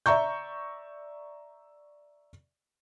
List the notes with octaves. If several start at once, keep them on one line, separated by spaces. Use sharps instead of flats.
D5 E5 A#5 C#6 G6